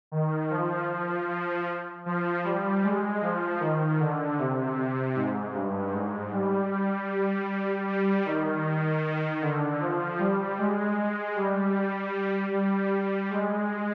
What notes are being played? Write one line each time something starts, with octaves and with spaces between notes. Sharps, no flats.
D#3
F3
F3
F3
F3
G3
G#3
F3
D#3
D3
C3
G#2
G2
G#2
G3
G3
G3
D#3
D3
F3
G3
G#3
G#3
G3
G3
G#3